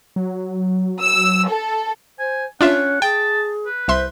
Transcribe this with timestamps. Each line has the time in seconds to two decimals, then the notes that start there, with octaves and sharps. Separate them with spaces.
0.16 F#3
1.00 E6
1.47 A4
2.19 C5 G#5
2.61 C#4 D4 F4 E5 F#5
3.02 G#4 G5 A5
3.66 B4
3.88 C2 C5 E5 C6